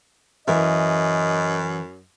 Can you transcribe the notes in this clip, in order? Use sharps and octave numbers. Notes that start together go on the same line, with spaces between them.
F#2 E3 A#4 D#5 E5